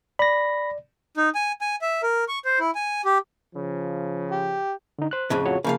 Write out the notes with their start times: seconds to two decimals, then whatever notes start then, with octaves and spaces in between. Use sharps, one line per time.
0.19 D5 B5 A#6
1.17 D#4
1.35 G#5
1.61 G#5
1.82 E5
2.03 A#4
2.28 C#6
2.45 C5
2.59 E4
2.75 G#5
3.05 G4
3.55 C#3 F3
4.31 G4
4.99 D3 D#4
5.11 C5 F#6
5.30 F2 A2 C#3
5.46 F4 F#4 C#5
5.64 C#3 F3 A#3 F5